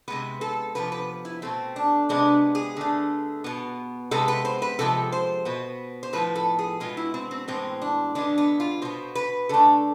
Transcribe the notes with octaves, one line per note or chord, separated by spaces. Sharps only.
C3 G#3 B3 B4
A4
C3 F3 B3 B4
B4
E4
B2 A3 C4
D4
C3 G#3 B3 D4
G#4
D3 A3
B2 B3
C3 G#3 B3 A4
B4
C5
B4
C3 F3 G#3 A4
C5
B2 B3
C5
A2 F3 B3 B4
A4
G#4
B2 G#3 B3 F4
E4
C4
C4
A2 E3 G#3 B3 C4
D4
D3 G#3 B3 D4
B3
F4
B2 B3 C5
B4
D3 A3 A4